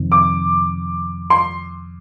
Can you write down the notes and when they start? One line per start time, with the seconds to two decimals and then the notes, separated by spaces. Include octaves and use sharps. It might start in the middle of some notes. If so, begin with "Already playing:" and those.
Already playing: F2 C3 D#3
0.12 D6
1.30 C6